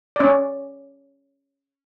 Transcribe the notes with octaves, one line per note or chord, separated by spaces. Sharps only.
C#4 D5